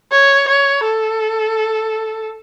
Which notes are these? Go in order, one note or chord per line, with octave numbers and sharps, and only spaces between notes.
C#5
C#5
A4